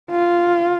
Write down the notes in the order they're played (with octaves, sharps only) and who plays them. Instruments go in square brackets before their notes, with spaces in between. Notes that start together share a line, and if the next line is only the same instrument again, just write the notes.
[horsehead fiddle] F4